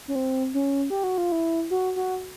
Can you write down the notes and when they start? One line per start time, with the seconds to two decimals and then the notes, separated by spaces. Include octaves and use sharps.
0.08 C#4
0.15 C4
0.54 C#4
0.90 G4
1.04 F#4
1.18 F4
1.32 E4
1.71 F#4
1.96 F#4